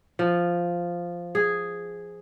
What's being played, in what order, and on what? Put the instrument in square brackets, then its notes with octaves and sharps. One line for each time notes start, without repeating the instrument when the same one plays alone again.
[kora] F3
G#4